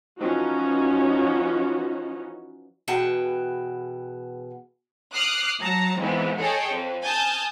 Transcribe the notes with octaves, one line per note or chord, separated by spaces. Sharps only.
E3 F3 C#4 D#4 F#4
E2 B2 G#4 F#5 G5 A5
D6 D#6 F6 F#6 C7
F#3 A5 A#5
F2 G#2 E3 B3
G#4 A4 C#5 D#5 G5 A5
F2
G#5 A5 D#6 F6 G6 A6